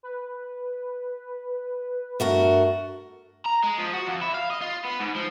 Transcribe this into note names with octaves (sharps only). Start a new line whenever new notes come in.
B4
G2 A3 F#4 A#4
A#5
G#3
F3
F#4
F2
E4
F5
D#5
F4
B3
G#2
F3